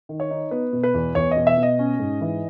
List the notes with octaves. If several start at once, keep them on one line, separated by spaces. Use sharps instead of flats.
D#3
C#5
D#4
B3 B4
B2
B4
E2
E2 C#5
D#5
B2
E5
B2
D#5
C#4
G#2
E3